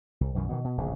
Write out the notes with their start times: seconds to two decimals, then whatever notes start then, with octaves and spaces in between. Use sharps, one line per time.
0.21 C2
0.35 B1 F#2 D#3 E3
0.50 B2 D#3 E3
0.64 B2
0.78 D1 A#1 G#2 C#3